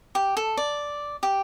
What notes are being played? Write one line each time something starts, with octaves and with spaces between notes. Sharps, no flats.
G4
A4
D5
G4